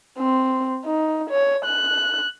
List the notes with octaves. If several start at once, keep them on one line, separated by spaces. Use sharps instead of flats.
C4
D#4
C#5
F#6